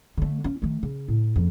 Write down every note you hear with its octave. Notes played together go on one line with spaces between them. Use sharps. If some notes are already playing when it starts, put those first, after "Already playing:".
D3 A3
C#4
D#3 A3
C#3
A2
F#1 F2